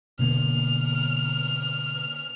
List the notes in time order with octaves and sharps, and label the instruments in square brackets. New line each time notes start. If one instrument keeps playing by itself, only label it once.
[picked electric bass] B2 D3 A#3 [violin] F6